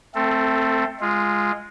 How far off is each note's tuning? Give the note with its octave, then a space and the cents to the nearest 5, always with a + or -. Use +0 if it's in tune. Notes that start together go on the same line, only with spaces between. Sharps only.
A3 +0 C4 +0 A4 +25
G#3 -5 F4 +0